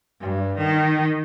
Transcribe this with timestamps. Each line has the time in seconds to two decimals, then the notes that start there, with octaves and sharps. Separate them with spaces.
0.21 G2
0.58 D#3